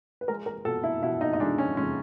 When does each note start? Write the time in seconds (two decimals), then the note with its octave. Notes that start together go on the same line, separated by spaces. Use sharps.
0.21 B4
0.28 G#3 A#4
0.46 A#4
0.65 B2 A4
0.84 E4
1.03 B2 E4
1.21 D#4
1.33 D#4
1.40 G#3 D4
1.58 C#4
1.77 G#3 C#4